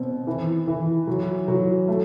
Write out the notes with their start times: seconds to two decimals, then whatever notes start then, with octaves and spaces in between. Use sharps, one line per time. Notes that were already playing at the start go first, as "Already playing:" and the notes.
Already playing: B2 C4
0.27 E3
0.67 E3
1.07 F#3
1.48 F#3
1.88 A3